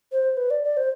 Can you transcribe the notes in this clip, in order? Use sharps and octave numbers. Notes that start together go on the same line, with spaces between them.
C5
B4
D5
D5
C5